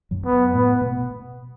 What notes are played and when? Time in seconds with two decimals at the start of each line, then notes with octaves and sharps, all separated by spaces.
0.11 F#2 F#3
0.25 B3
0.53 A2 A3 B3
0.81 B2 B3